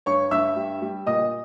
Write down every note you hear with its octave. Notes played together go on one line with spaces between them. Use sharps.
G2 C#5 C#6
G2 E5 E6
G3
G3
A#2 D#5 D#6